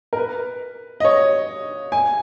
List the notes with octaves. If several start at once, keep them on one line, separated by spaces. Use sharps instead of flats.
A#4
B4
D#5
C#5
G#5